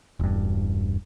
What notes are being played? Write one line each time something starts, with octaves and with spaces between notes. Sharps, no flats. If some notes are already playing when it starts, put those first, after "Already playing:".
E1 G2